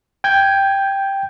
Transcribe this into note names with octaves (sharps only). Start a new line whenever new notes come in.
G5 G6 G#6